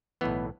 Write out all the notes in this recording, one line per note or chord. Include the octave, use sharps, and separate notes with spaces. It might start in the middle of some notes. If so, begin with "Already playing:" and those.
B1 A2 E3 B3